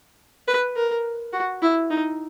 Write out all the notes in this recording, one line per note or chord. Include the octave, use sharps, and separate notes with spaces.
B4
A#4
F#4
E4
D#4